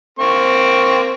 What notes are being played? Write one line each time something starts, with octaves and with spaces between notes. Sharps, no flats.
A#3 C4 C#6